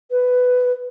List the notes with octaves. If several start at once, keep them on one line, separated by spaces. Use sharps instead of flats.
B4